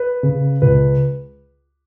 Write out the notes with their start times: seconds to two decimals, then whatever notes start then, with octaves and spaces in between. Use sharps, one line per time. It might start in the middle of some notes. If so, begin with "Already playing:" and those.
Already playing: B4
0.23 C#3
0.62 C#2 B4